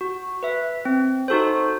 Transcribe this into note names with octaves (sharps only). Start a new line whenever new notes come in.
F#4
B4 E5
C4
D#4 F#4 A4 C5